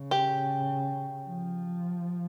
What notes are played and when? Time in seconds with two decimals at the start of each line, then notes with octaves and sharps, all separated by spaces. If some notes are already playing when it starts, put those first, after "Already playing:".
Already playing: C#3
0.11 G4
1.28 F3